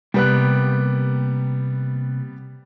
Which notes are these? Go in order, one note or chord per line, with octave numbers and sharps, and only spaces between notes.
C3 G3 A#3 B3 G4 F#6